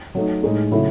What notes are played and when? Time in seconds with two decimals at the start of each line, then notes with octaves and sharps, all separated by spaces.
0.15 F#3 A3 D#4
0.43 A2 G#3 D#4
0.71 C#3 F#3 A3 E4